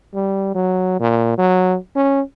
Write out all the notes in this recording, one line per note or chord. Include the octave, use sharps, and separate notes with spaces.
G3
F#3
A#2
F#3
C#4